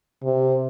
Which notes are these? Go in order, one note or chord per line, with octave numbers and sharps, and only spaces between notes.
C3